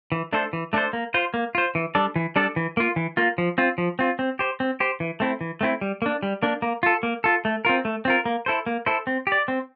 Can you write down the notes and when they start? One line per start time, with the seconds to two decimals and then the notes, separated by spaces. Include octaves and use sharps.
0.12 E3
0.33 A3 D4 A4 C5
0.53 E3
0.73 A3 D4 A4 C5
0.93 A#3
1.14 F4 C5
1.34 A#3
1.55 F4 C5
1.75 E3
1.95 G3 D4 A4 D5
2.16 E3
2.36 G3 D4 A4 D5
2.56 E3
2.77 A#3 F4
2.96 E3
3.17 A#3 F4
3.38 F3
3.58 C4 F4
3.78 F3
3.99 C4 F4
4.19 C4
4.39 G4 C5
4.60 C4
4.80 G4 C5
5.00 E3
5.20 A3 C4 E4
5.41 E3
5.61 A3 C4 E4
5.81 G3
6.02 A#3 D4
6.23 G3
6.43 A#3 D4
6.62 A#3
6.83 F4 A4
7.03 A#3
7.24 F4 A4
7.45 A3
7.65 C4 F4 A#4
7.85 A3
8.05 C4 F4 A#4
8.26 A#3
8.46 E4 A4 C5
8.66 A#3
8.86 E4 A4 C5
9.07 C4
9.27 G4
9.32 D5
9.48 C4